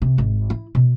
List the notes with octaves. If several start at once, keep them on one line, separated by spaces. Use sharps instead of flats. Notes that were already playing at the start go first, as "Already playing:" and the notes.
C3
G#1
E4
B2